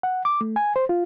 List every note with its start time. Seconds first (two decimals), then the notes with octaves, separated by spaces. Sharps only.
0.03 F#5
0.25 D6
0.41 A3
0.56 G#5
0.76 C5
0.89 F4